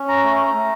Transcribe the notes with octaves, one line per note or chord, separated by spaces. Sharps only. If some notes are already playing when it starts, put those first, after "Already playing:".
Already playing: C#4
A#5
A3
A3